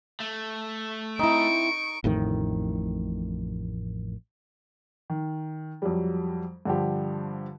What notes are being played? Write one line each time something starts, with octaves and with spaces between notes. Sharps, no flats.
A3
C4 D#4 E4 C#6 D7
A1 F2 A2 D#3
D#3
F2 F#3 G3
G2 D3 F3 G4